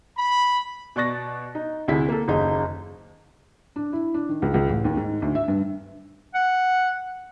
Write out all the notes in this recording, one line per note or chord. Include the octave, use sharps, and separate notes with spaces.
B5
B2 D5 C#6 F#6 A6 A#6
D#4
D2 C3 E4 G#4 B6
A#3 A4
F#1 D#2 D#4 G#4
D4
E4
D4
D#3
C#2
C#2
A1
D#2
G#2
D2
E5
G2
F#5